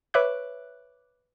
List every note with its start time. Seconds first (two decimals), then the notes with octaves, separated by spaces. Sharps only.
0.14 B4 C#5 E5 D6 F#6